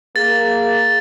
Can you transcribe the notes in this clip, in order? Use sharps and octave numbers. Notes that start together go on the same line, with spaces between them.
A#3 G#4 A6